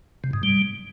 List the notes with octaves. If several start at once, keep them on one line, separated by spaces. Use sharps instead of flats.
C3
G#2
G3